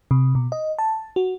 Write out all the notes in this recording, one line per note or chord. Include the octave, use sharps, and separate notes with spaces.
C3
B2
D#5
A5
F#4